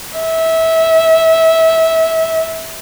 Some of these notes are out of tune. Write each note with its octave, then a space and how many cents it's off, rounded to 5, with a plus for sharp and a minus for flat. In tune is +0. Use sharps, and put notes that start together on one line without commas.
E5 -20